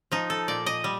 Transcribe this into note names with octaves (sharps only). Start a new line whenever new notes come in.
F3 D#4
A4
A#2 D5
D#5
G3